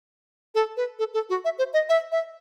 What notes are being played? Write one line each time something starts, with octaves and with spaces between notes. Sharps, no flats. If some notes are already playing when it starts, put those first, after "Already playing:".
A4
B4
A4
A4
F#4
E5
C5
D#5
E5
E5